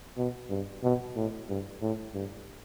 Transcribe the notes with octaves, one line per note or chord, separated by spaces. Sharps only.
B2
G2
B2
A2
G2
A2
G2